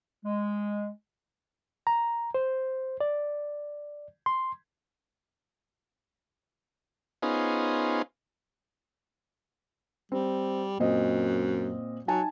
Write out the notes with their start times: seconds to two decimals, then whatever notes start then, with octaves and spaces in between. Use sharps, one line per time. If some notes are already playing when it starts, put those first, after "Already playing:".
0.25 G#3
1.87 A#5
2.34 C5
3.01 D5
4.26 C6
7.22 B3 C#4 D#4 F4 G#4 C5
10.12 G3 C4
10.80 F#2 A#2 C4 D#5
12.08 F#3 D#4 G#5 A5